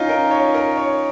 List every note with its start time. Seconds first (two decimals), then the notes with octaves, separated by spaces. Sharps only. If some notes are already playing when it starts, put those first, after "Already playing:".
Already playing: C#4 D#4 F4
0.09 A#4
0.31 C#5
0.54 A#4
0.77 C#5